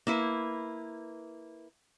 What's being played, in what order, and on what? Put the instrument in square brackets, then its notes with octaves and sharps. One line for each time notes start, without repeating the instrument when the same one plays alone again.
[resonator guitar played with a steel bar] A#3 E4 B4